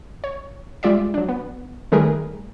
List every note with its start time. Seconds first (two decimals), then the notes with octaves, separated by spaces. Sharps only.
0.24 C#5
0.83 G3 G#3 F4 D5 E5
1.14 F#3 D4
1.29 B3
1.92 D#3 G3 A3 G#4 A#4 B4